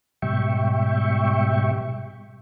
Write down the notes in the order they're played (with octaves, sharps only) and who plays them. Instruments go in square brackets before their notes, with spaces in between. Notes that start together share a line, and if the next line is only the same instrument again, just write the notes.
[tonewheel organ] G#2 B2 G3 E5 G5 C#6